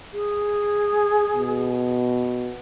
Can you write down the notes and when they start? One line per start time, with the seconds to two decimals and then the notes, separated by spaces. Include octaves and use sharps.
0.13 G#4
1.33 B2